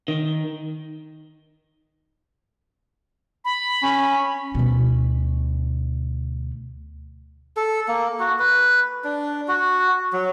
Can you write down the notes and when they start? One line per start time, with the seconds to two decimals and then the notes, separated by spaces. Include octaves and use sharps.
0.08 D#3
3.45 B5
3.83 C#4
4.55 D2 B2
7.57 A4
7.88 A#3
8.20 F#4
8.39 B4
9.04 D4
9.48 F#4
10.13 F#3